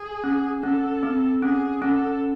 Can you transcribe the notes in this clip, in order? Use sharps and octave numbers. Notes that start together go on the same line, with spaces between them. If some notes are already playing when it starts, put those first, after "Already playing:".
Already playing: G#4
C#4
C#4 A4
C4
C#4 G#4
C#4 A4